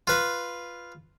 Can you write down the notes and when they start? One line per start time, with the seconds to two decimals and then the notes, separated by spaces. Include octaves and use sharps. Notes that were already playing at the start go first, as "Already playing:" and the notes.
0.07 F4 B4